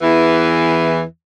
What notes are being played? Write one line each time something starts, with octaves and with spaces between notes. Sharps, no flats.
E2 E3